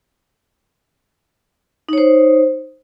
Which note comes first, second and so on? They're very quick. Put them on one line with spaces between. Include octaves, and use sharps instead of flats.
D#4 C#5 C5